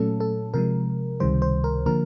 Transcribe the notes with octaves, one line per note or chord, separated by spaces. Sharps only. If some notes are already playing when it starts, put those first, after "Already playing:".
Already playing: A#2 F#3 A3 C#4 A4
A4
C3 F3 G#3 A#4
C#2 C3 D#3 G3 C5
C5
A#4
D3 F3 A#3 A#4